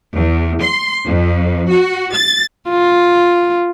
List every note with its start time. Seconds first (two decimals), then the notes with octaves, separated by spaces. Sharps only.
0.14 E2
0.63 C6
1.07 F2
1.70 F#4
2.15 A6
2.70 F4